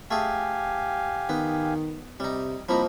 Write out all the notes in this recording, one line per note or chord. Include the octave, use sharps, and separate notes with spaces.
A3 G4 G#4 F5 G#5
D#3 B3
C3 G3 D#4
C2 F3 A#3 D#4 B5